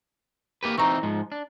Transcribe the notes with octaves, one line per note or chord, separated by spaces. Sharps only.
A#3 G4 B4
E3 C4 D#4 A#5 C#6
G#2 F3
D4